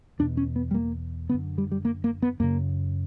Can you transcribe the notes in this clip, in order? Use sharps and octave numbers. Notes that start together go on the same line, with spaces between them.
E2 B2 D4
C#4
B3
G3
A#3
F#2 D3 B3
G3
G3
A#3
A#3
B3
F#2 C#3 A#3